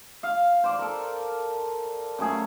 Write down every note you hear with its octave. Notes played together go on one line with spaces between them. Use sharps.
F5
C5 D5
A4 A#4
C#3 F#3 A3 G#4